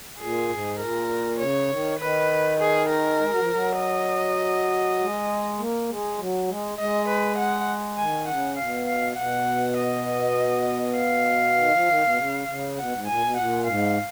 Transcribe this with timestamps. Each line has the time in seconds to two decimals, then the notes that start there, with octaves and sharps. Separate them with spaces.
0.19 A#2 G#4
0.50 G#2
0.79 A#2 A#4
1.39 C#3 C#5
1.69 D#3
1.99 D#3 B4
2.60 G#4
2.89 A#4
3.20 G#3
3.29 F#3
3.40 F3
3.51 F#3
3.79 D#5
4.99 G#3
5.58 A#3
5.89 G#3
6.18 F#3
6.48 G#3
6.78 G#3 D#5
7.08 B4
7.38 F#5
7.98 D#3 G#5
8.27 C#3 F#5
8.58 B2 F5
8.88 F5
9.17 B2 F#5
9.77 D#5
10.97 F5
11.56 D#3
11.73 F3
11.87 D#3
12.02 B2
12.16 C#3
12.47 C#3
12.77 B2 F#5
12.92 G#2
13.06 A#2 G#5
13.21 B2
13.36 A#2 F#5
13.66 G#2 F5